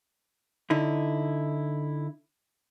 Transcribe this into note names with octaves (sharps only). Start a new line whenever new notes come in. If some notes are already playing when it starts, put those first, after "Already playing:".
D3 D#4 E4